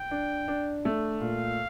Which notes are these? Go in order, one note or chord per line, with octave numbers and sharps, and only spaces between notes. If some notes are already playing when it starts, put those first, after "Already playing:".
Already playing: G5
D4
D4
A3
A#2 F5